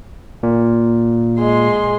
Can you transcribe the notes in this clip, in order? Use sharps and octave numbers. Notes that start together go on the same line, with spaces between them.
A#2
G#3 C6